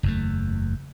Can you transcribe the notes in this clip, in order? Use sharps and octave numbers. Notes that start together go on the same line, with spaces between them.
F#1 E2 A3